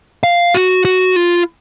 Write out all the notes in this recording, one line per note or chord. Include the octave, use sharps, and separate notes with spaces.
F5
F#4
F#4
F4